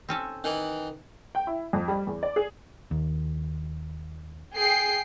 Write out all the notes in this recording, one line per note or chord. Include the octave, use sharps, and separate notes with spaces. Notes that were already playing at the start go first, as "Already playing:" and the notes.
C4 C#4 A4
D#3 E3
G5
E4
F2
G3
E2
D5
G#4
D#2
G#4 G5 C7